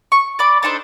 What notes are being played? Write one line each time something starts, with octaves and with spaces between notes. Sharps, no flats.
C#6
D5 B5 D6
D4 D#4 A4 C5